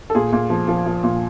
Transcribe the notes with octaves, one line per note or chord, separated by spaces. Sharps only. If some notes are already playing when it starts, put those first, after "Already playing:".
A4
A#2 G#4
A#2
F3
F3
F3
A#2